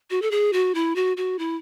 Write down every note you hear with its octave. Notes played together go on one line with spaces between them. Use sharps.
F#4
A4
G#4
F#4
E4
F#4
F#4
E4